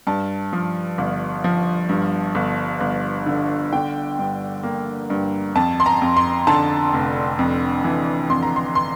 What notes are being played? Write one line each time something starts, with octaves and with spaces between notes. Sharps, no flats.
G2 A5
F3
G1
F3
G2
G1
G1
D3
D3 G5
G2
A#3
G2
F2 A5
C6
A#5
F2
C6
D3 A5
F1
F2
E3
F2 C6
A#5
C6
C6